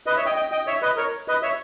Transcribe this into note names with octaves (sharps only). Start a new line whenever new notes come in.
B4 D#5
C#5 E5
D#5 G5
D#5 G5
D#5 G5
C#5 E5
B4 D#5
A#4 C#5
B4 D#5
C#5 E5